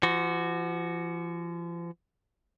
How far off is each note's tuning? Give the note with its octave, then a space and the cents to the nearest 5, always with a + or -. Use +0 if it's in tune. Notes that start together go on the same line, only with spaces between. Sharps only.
F3 -40 F#4 +0